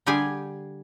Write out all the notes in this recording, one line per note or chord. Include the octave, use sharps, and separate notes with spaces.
D3 G3 G4 G#4 G#5